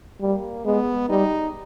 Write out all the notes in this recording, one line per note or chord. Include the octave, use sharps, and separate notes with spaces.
G3 A#3
G#3 B3
G3 D#4